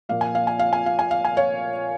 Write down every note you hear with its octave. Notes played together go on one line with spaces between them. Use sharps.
A#2 F3 A#3 F5
G#5
F5
G#5
F5
G#5
F5
G#5
F5
G#5
C#5 F5